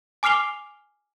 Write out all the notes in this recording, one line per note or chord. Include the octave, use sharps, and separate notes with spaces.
G#5 D6 F6 C7 F7 G7